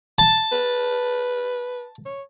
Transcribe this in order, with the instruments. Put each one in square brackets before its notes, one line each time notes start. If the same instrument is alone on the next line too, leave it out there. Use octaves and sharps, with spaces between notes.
[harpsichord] A5
[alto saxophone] B4
C#5